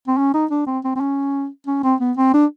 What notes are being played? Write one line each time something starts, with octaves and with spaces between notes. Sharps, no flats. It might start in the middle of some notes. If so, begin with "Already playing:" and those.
C4
C#4
D#4
D4
C4
C4
C4
C#4
C#4
C4
B3
C4
D4